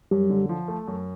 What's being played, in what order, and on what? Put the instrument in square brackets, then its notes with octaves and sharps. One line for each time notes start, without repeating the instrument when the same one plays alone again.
[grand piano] F#2 [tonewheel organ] G3
[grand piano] D3
F3
A3
F#2